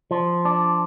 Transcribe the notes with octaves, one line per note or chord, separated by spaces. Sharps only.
F3
D4